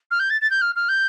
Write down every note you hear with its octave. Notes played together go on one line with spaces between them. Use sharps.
F6
G6
A6
A6
G6
F6
F6
G6